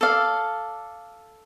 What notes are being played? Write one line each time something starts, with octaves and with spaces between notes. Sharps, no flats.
A4 D5 F5